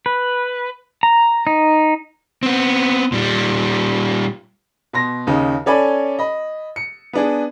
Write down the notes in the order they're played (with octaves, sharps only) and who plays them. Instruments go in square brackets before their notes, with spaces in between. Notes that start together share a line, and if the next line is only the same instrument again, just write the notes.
[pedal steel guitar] B4
A#5
D#4
[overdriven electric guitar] B3 C4
A#2 G3
[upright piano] B2 C6 A#6
D#2 C#3 D#4
C#4 A4 D5 G#5 B5
D#5 B5
C#7
B3 D4 G#4